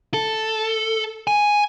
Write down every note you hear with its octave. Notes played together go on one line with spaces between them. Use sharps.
A4
G#5